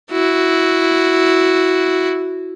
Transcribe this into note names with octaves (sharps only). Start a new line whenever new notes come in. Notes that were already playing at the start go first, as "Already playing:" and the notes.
E4 F#4